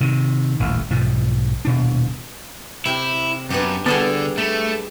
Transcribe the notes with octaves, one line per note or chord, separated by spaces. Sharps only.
C3 D#3
D#1 A1 D2
B1 G#2 F3
D#1 B2 D4
C3 E4 G5
F#2 B3 D4 G4
D3 G3 B3 G#4 D5 A5
A3 B5